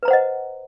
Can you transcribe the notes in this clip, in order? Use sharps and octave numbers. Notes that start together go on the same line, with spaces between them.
B4 C5 D#5 F#5 A#5